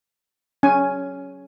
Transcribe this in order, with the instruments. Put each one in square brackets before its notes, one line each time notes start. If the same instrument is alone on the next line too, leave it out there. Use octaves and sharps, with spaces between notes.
[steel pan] C#4 G#5